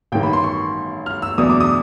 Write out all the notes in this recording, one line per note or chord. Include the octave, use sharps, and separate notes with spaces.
A1 G2 D#3 G5
B5
C6
C#6
F6
E6
E2 B2 F#3 A3 D4 D#6
D6
D#6